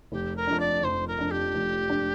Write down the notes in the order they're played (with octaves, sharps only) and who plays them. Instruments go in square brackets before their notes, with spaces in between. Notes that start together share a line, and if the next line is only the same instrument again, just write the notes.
[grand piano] F1 [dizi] G4
[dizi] A#4
[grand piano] F2 F3 D4
[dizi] D5
[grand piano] F1 [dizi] C5
[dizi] A#4
[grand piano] F2 F3 D4
[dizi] G4
[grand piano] F1
F3 D4